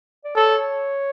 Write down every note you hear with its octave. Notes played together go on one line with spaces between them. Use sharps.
D5
A4 C#5